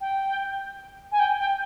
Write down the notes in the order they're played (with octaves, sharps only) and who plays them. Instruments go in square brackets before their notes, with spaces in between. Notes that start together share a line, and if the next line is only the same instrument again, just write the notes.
[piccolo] G5
G#5
G5
G5